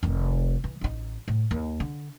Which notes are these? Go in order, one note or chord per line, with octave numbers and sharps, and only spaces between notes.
F1 D#3
E3
A1 D#4
A2
D#2
D3